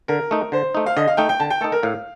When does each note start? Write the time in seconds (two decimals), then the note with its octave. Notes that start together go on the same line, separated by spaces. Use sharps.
0.08 D3 A#4
0.31 A3 D#4
0.52 D3 C5
0.75 A3 D#4
0.86 F5
0.97 D3 D#5
1.08 F5
1.17 A3 D#4 G5
1.29 G5
1.40 D3 A5
1.50 G5
1.61 A3 D#4 A4
1.72 A#4
1.83 A2 F5